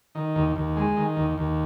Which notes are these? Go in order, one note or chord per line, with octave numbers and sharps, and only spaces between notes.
D#3
D#2
D#2
G#3
D#3
D#2
D#2